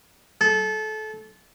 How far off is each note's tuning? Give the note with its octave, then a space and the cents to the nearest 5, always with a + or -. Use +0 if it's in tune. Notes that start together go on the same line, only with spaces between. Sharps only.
A4 -25